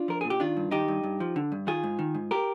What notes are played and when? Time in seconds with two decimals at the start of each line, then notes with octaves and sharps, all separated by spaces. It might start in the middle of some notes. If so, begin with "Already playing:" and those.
Already playing: D4 F4
0.08 F3 A#4
0.21 A#2 G#4
0.30 G4
0.40 D#3 D4 F4
0.57 G2
0.71 D#3 D#4 G4
0.88 G2
1.04 G2
1.20 F3
1.36 D3
1.52 G2
1.67 D#3 F4 G#4
1.83 G#2
1.99 D#3
2.15 G#2
2.31 G4 A#4